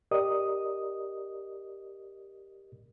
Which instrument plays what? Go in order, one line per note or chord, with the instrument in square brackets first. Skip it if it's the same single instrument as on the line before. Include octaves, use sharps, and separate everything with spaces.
[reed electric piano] G4 A#4 D5 D#5 D#6